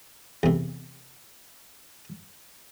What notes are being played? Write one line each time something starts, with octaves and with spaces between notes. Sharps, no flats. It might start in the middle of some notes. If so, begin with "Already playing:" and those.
E2 C3